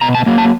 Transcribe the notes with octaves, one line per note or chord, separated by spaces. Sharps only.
B2 A#5
A5
F#3 A#3
A5